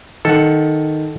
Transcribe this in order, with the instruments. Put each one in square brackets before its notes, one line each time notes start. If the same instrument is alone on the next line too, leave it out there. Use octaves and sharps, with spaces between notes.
[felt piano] D#3 [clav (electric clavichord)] A4 F#5